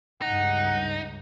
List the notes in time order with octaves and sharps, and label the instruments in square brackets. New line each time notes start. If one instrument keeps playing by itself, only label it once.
[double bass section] C#2 G2 [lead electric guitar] D#4 [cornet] F#5